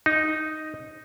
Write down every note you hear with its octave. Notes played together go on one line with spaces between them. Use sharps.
D#4